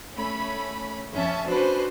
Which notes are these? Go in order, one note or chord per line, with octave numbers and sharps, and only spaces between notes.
A3 C#4 B5
F2 C#4 E5 A5
C#4 D4 F#4 B4 C5